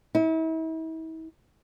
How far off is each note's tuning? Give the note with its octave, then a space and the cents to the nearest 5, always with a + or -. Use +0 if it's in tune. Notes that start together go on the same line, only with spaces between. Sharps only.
E4 -40